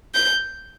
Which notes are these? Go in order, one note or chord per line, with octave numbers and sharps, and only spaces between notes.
G6